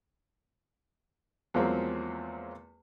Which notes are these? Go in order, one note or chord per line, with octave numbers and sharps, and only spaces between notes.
E2 F3 F#3 G#3 A#3 C4